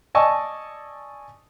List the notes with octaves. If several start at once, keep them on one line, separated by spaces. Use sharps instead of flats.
D5 D#5 G#5 A5 C#6 E6